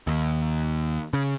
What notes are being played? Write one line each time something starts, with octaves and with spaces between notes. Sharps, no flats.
D#2
C#3